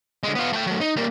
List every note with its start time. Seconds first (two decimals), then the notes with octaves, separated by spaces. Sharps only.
0.23 D3 G#3
0.35 B3 F4
0.53 A3 G5
0.66 F#3 A3
0.80 D#4
0.96 G3 A#3